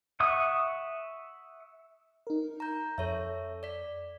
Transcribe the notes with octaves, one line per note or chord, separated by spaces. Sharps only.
E5 F#5 C#6 D#6
D#4 A#4
A#5 G6
F2 A4 C#5 E5
D5 B6